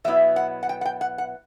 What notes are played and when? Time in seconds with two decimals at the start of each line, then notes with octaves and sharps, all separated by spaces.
0.04 B2 F#3 B3 E4 E5
0.36 F#5
0.63 F#5
0.69 G5
0.81 F#5
0.85 G5
1.01 F#5
1.18 F#5